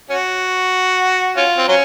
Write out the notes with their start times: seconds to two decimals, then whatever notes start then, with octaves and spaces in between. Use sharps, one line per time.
0.10 C#4 F#4
1.37 C#4 F4
1.58 C4
1.68 F#3 C#4